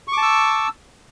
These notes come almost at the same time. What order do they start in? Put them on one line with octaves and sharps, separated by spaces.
C#6 D6 A5 E6